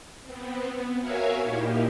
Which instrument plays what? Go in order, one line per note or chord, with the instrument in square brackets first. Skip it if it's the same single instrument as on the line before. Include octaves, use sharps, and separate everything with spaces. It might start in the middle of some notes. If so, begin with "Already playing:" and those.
[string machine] B3 C4
B3
F#4 A#4 C#5 E5 F5 G#5
A#2 D#4 E4 G4